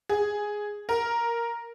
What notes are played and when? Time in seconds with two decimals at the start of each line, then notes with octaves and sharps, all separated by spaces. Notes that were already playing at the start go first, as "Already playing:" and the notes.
0.09 G#4
0.89 A#4